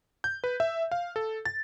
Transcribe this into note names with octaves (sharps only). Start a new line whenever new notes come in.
G6
B4
E5
F5
A4
A6